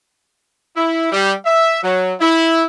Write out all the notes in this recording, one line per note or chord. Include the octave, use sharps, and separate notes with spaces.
E4
G3
E5
F#3
E4